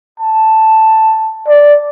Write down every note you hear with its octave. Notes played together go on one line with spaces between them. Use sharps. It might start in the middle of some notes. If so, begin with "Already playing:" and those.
A5
D5